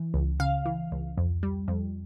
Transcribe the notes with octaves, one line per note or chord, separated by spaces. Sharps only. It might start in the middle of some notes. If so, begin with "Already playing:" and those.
Already playing: E3
C#2
C#3 F5
E3
C#2
F2
G3
F2